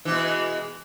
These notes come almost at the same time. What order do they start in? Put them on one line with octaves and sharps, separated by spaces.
E3 B2 G#3